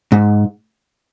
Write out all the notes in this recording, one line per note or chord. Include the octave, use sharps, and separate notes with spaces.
G#2